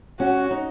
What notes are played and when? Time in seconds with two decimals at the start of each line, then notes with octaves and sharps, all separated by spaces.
0.20 C#4 F#4
0.51 D#4